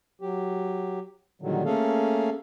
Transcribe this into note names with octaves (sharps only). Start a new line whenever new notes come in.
F#3 G4
A#2 D3 D#3 F#3 G3
A3 A#3 C#4 G#4 A4 F5